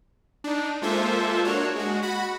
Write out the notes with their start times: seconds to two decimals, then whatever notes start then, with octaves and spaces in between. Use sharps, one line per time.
0.44 D4 D#4
0.82 G#3 A#3 F4 A4 C5 E5
1.45 A#3 D4 F#4 C#5
1.76 G#3 F#4
2.03 F#4 F#5 B5